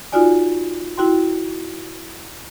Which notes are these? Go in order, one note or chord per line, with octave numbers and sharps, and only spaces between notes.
D#4 F4 F#4 D5 G#5
E4 F#4 G5 C6